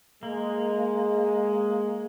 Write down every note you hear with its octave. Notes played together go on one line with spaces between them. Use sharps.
G#3 A#3